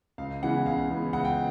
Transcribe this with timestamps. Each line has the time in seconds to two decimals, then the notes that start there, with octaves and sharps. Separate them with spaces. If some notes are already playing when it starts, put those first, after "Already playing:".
0.18 C#2 F5
0.42 C#3 E3 G#3 B3 F#5
0.66 C#2 F5
0.89 C#3 E3 G#3 B3
1.13 C#2 F#5
1.25 G5